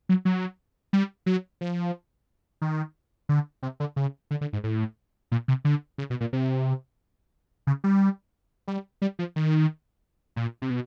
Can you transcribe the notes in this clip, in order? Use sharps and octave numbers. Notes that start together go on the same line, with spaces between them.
F#3
F#3
G3
F#3
F3
D#3
D3
C3
D3
C#3
D3
D3
G#2
A2
A#2
C3
D3
C#3
B2
A#2
C3
C#3
G3
G3
G3
F3
D#3
A#2
C3
B2